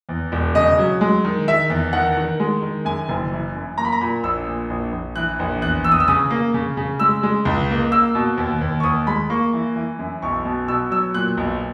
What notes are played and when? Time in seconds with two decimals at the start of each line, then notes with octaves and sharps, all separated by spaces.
0.09 E2
0.32 E1
0.55 C#3 D#5
0.79 F#3
1.01 G#3
1.25 D#3
1.48 D#3 E5
1.70 E2
1.93 D#3 F#5
2.17 D#3
2.40 G#3
2.62 D#3
2.85 F#2 G#5
3.09 F#1
3.32 E3
3.55 F#2
3.77 A#3 A#5
3.85 B5
3.92 A#5
4.01 A#2 B5
4.23 A#1 E6
4.47 A#2
4.70 A#1
4.92 A#1
5.16 E3 F#6
5.39 A#1
5.62 E2 F#6
5.84 E2 E6
5.92 D#6
6.00 E6
6.08 C#3 D#6
6.30 A#3
6.54 C#3
6.77 C#3
7.00 G#3 E6
7.23 G#3
7.45 C#2
7.70 A#3
7.92 A#3 E6
8.15 B2
8.38 D#2
8.61 D#2
8.80 C#6
8.84 D#2 D#6
9.07 G#3 B5
9.30 A#3 C#6
9.53 E3
9.76 E3
9.99 F#2
10.22 B1 C#6
10.45 B2
10.68 B2 E6
10.91 F#3 E6
11.14 A#2 F#6
11.37 B1